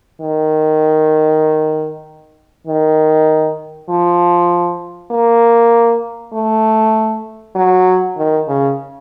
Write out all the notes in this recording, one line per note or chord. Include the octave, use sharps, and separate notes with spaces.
D#3
D#3
F3
A#3
A3
F#3
D#3
C#3